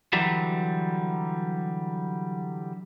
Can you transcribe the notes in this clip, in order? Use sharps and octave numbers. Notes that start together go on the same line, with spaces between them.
D3 E3 F#3 G3